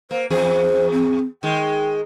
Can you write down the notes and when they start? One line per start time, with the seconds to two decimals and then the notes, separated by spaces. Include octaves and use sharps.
0.11 A#3 C5
0.30 E2 G#4 C5
0.92 C4
1.43 D#3 G#3 G5